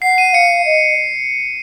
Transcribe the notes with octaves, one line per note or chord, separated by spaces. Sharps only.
F#5 C7
D#7
F5 C#7
D#5